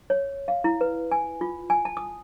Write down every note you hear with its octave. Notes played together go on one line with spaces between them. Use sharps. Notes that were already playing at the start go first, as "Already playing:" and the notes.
C#5
F5
E4
B4
G#5
F4
G#5
A5
D#6